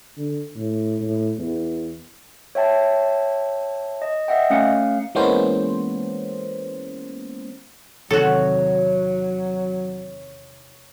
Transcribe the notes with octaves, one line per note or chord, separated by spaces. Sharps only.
D3
A2
A2
E2
C#5 E5 G5 A5
D#5
D#5 E5 F#5 G5
A3 C#4 F5 C#7
E3 G#3 A#3 B3 C#4 C5
E2 C3 D#3 F#3 F#4 A4 C#5